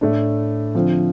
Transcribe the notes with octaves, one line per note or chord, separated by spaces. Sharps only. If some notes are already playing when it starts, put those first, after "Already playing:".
A2 A3 D4
D3 F3 C4